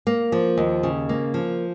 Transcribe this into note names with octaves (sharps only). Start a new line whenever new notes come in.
A#3
F3
D#2
C#3
A#3
F3